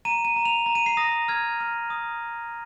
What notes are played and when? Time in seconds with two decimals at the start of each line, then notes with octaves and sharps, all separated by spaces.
0.05 A#5 D#7
0.25 D#7
0.36 A#5
0.45 F7
0.66 A#5
0.75 D#7
0.86 C7
0.97 D#6 A#6
1.28 F6 G#6
1.60 F6
1.90 D#6